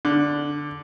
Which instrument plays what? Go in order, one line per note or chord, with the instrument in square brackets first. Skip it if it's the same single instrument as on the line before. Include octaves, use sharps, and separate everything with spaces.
[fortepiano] D3